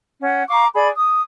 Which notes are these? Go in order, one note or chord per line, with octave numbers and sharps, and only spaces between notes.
C#4 F#5
F5 A#5 C#6 D6
G#4 D5 B5
D#6